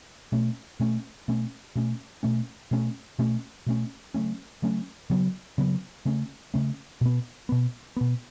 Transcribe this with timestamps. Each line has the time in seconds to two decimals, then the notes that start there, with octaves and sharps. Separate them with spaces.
0.32 B2 A3 C#4
0.80 B2 A3 C#4
1.28 B2 A3 C#4
1.75 B2 A3 C#4
2.23 B2 A3 C#4
2.71 B2 A3 C#4
3.19 B2 A3 C#4
3.66 B2 A3 C#4
4.14 C#3 F#3 A3 C#4
4.62 C#3 F#3 A3 C#4
5.10 C#3 F#3 B3
5.58 C#3 F#3 B3
6.05 C#3 A3 C#4
6.54 C#3 A3 C#4
7.01 B2 B3
7.49 B2 B3
7.96 B2 B3